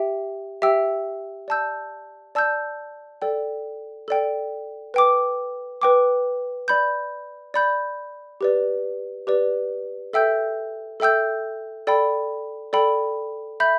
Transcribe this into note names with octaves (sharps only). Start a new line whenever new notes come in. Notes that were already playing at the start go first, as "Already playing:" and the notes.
Already playing: G4 E5 G5
G4 E5 G5 E6
D5 A5 E6 G6
D5 A5 E6 G6
A4 D5 G5
A4 D5 G5
B4 G5 D6
B4 G5 D6
D5 B5 G6
D5 B5 G6
G4 B4 D5
G4 B4 D5
A4 E5 G5 E6 G6
A4 E5 G5 E6 G6
A4 D5 G5 B5
A4 D5 G5 B5
E5 B5 G6